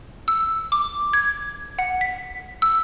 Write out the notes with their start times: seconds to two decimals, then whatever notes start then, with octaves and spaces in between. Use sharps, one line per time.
0.28 E6
0.72 D6
1.13 G#6
1.79 F#5
2.01 B6
2.62 E6